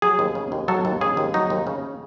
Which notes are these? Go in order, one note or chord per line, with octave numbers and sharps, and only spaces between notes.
F#3 G#4
D#2
C#3
D#2
F#3 A4
D#2
C#3 G#4
D#2
F#3 D#4
D#2
C#3